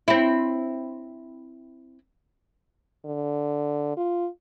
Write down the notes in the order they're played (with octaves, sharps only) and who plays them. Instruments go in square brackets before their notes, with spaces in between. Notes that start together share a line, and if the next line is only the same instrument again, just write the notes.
[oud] C4 E4
[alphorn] D3
F4